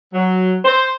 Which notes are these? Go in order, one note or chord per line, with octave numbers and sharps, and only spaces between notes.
F#3
C5